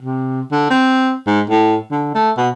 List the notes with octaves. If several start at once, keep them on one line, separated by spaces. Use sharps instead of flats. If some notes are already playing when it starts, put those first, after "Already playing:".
C3
D3
C4
G#2
A2
D3
A3
B2